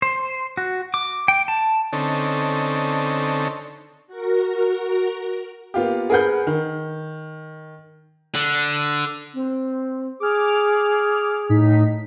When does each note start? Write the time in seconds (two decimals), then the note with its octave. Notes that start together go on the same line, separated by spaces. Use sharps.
0.02 C5
0.57 F#4
0.94 D6
1.28 G5
1.48 A5
1.93 D3 C4 C#4 D#4 A4
4.07 F#4 A#4
5.74 A#3 B3 F4 G4
6.10 G#4 A#4 B4 F#5 G6
6.47 D#3
8.35 D3
9.34 C4
10.20 G#4 D6 F6
11.49 A2 D#4 B6